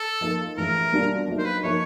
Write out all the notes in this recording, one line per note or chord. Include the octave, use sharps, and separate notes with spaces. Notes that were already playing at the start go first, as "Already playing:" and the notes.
Already playing: A4
F3 A#3 D#4
A2 E3 G#3 C#4 A#4
B2 G3 A#3 D4 F4
F#3 A#3 D#4
C5
B4
F3 A#3 D#4 C#5